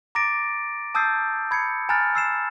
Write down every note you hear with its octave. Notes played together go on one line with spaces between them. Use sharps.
A#5 D6 A6 A#6 D7
A5 D#6 E6 G6 A6 C7
B5 G#6 C7 C#7
G#5 A#5 B5 F6 F#6 A6
E6 C7 E7